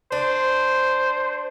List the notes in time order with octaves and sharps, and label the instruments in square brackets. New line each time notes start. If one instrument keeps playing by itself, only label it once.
[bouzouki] D4 [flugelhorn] C5